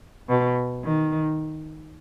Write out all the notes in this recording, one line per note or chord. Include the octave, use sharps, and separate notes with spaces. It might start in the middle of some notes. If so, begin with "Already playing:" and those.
B2
D#3